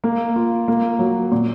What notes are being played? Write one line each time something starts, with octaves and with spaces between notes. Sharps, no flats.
A#3
F4
A#3
F#3
A#2